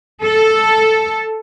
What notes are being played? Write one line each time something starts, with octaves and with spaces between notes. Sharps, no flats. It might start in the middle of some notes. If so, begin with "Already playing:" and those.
A4